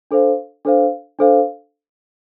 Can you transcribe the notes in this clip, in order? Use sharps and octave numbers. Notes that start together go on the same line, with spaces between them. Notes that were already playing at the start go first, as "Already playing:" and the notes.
D4 A4 C5 F5
D4 A4 C5 F5
D4 A4 C5 F5